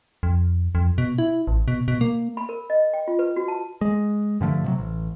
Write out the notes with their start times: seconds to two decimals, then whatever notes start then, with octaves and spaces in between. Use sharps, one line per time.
0.23 F2
0.75 F2
0.98 B2
1.18 E4
1.47 A1
1.68 B2
1.88 B2
2.01 A#3
2.37 B5
2.49 A#4
2.70 D#5
2.93 G5
3.08 F4
3.19 B4
3.36 F#4
3.48 A5
3.81 G#3
4.41 G2 D3 F3 A3
4.64 C3 D#3 F#3
4.78 A1